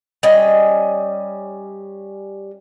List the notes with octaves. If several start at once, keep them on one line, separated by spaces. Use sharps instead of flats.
G3 C#4 D#5